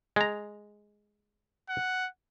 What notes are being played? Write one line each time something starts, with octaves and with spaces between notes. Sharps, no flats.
G#3 A#5
F#5